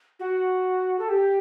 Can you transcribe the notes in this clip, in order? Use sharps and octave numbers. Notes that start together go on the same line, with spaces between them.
F#4
A4
G4